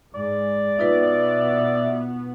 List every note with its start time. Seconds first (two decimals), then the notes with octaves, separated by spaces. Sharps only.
0.15 G#2 D5
0.79 B2 B3 D#4 F4 B4 E5